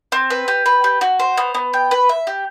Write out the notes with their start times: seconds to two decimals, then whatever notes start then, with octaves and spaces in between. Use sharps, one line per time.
0.12 C4
0.30 B4
0.48 G4
0.66 B4
0.84 G4
1.01 F#4
1.19 C5
1.37 B3
1.55 B3
1.73 G5
1.91 B4
2.09 E5
2.27 G4